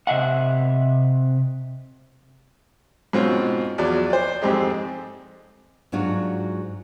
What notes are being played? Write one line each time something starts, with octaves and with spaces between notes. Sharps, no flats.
C3 D#5 E5 F#5
G#2 B2 C4 C#4 F4
E2 F3 F#3 D5
C5 D5
F2 G#2 C4 G4 G#4 D#5
G#2 F#3 D4 F4 F#4